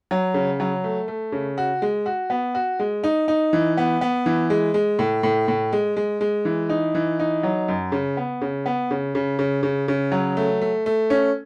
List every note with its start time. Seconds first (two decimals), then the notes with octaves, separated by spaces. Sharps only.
0.11 F#3
0.34 C#3
0.60 F#3
0.84 A3
1.08 A3
1.32 C#3
1.58 F#4
1.82 G#3
2.06 F#4
2.30 B3
2.55 F#4
2.79 G#3
3.04 D#4
3.28 D#4
3.53 E3
3.77 B3
4.01 B3
4.26 E3
4.50 G#3
4.74 G#3
4.99 A2
5.23 A2
5.48 A2
5.73 G#3
5.97 G#3
6.21 G#3
6.45 E3
6.70 D#4
6.95 E3
7.19 D#4
7.43 F#3
7.68 F#2
7.92 C#3
8.17 B3
8.41 C#3
8.66 B3
8.91 C#3
9.15 C#3
9.39 C#3
9.63 C#3
9.88 C#3
10.12 F#3
10.37 A3
10.62 A3
10.86 A3
11.10 C#4